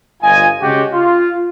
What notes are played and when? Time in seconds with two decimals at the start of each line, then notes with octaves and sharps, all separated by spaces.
0.22 G1 F4 D#5 G#5
0.62 C#3 G#3 F#4 G4
0.92 F4